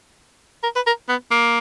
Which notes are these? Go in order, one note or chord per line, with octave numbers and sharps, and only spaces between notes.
A#4
B4
A#4
B3
A#3